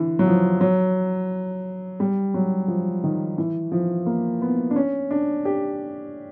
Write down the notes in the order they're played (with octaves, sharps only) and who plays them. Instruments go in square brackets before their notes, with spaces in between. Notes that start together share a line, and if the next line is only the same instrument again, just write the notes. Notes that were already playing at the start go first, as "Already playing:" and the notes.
Already playing: [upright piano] D3 E3
F#3
F3
F#3
G3
F#3
F3
D#3
E3
F3
A#3
B3
D4
C#4
D4
G4